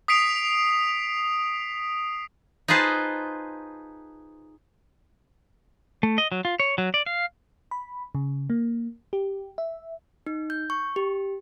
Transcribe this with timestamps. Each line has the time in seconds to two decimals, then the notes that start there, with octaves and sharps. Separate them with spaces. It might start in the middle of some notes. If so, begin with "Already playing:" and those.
0.08 D#6 B6 C7 D7 F7
2.68 D#4 F4 G#4 B4 C5 A5
6.03 A3
6.18 D#5
6.32 F#3
6.45 F4
6.60 C#5
6.78 F#3
6.94 D5
7.06 F5
7.71 B5
8.15 C#3
8.50 A#3
9.13 G4
9.58 E5
10.27 D#4
10.50 G6
10.70 C#6
10.96 G4